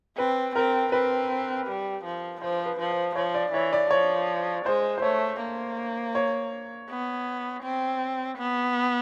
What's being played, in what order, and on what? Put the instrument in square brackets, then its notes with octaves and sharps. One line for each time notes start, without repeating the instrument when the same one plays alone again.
[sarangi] C4 [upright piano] B4
[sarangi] C4 [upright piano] A#4
[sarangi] C4 [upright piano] B4
[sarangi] G3
F3
[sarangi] F3 [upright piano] C5
[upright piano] B4
[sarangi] F3
[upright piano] C5
[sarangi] F3 [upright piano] C#5
[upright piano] D5
[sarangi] E3 [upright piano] C#5
[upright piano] D5
[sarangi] F3 [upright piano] C#5
[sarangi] G#3 [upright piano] C5
[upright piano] C5
[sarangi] A3 [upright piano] C#5
[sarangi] A#3
[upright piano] C#5
[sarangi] B3
C4
B3